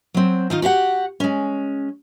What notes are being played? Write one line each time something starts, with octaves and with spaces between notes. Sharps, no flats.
F#3 C4
D#3 D#4 F4
F#4 G4 F5 F#5
G#3 C#4